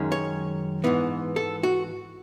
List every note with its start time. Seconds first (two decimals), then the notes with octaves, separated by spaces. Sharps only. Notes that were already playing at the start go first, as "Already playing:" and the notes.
Already playing: F#2 D#3 G#3 C#4
0.12 C#5
0.84 G#2 E3 B3
1.36 A4
1.63 F#4